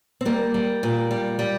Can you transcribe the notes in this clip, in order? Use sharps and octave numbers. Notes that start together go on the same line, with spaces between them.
C4
G3 A#3
G3
A#2
G3
G3